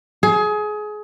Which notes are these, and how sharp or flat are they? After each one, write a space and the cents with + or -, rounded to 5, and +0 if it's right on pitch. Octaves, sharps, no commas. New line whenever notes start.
G#4 +25